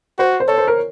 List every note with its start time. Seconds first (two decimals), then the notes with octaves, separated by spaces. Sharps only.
0.19 F#4 C5
0.40 C5
0.48 A4 C#5
0.58 C5
0.68 A#4